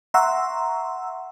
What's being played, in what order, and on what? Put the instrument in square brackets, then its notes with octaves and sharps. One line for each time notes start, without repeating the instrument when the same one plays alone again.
[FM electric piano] E5 F#5 A#5 C6 C#6 E6